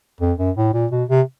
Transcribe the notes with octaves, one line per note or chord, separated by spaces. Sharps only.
F2
F#2
A2
A#2
B2
C3